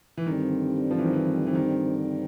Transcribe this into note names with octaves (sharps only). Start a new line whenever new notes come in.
E3
G2 D3 D#3 G3 C4
F3
E3
D#3
E3
E3
D#3